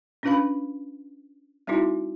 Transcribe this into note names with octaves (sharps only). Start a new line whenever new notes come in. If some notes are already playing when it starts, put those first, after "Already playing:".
C#4 D4 F4 B4 F5 B5
G3 C4 D#4 E4 F#4